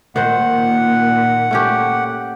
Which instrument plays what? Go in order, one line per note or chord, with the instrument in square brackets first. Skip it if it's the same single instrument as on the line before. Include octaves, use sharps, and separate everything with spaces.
[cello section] A#2 [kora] D#3 C5 [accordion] F#5
[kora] A3 C#4 G4